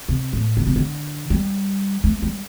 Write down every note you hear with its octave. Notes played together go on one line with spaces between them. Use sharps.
C3
A2
D3
C3
D3
G3
A3
G3